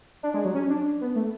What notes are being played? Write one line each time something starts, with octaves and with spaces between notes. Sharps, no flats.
D4
G#3
F#3
C#4
D4
B3
A3